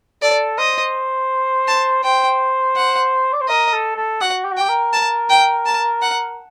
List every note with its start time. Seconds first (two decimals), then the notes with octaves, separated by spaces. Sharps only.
0.22 A4 D5
0.58 C5 D#5
1.68 A5
2.04 C5 G5
2.76 F#5
3.33 D5
3.41 C5
3.48 A#4 D#5
3.73 A4
3.96 A4
4.21 F#4 F#5
4.45 G4
4.52 F#4
4.57 G4 G5
4.69 A#4
4.93 A5
5.30 G5
5.66 A5
6.02 F#5